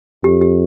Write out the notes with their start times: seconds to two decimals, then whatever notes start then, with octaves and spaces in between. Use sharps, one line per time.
0.24 F2 G4
0.41 G4